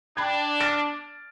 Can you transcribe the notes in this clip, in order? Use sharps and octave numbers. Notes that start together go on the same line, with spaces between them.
D4 G5 B5 G#6
F6 A6 D7